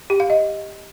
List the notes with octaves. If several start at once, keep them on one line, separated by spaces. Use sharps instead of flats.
G4
F5
D#5